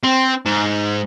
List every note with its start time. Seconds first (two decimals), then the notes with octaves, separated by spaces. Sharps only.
0.04 C4
0.46 G#2